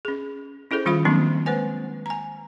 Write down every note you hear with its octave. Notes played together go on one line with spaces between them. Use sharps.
C#4 G#4
C#4 E4 G#4 A4 C5
D#3 G3 C#4 F4 F5 B5
D#3 F3 F#3 A#3 C4 D4
G#3 B4 C5 G#5
G#5 A#5